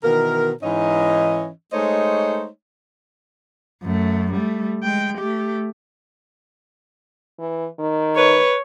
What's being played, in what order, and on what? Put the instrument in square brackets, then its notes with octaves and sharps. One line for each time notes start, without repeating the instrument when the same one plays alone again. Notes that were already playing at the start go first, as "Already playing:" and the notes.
[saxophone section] B2 D#3 E3 A#4
G#2 E3 C#4 D#4 D#5
G#3 A3 D#4 C5 C#5 D#5
[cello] F#2 A3
G3 A3
G#3 G5
A3 G4
[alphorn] E3
D#3
[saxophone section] B4 [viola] C#5